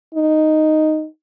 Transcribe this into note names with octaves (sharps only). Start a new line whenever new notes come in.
D#4